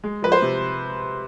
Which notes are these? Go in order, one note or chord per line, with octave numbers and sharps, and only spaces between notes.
G#3
F3 B4
C5
C3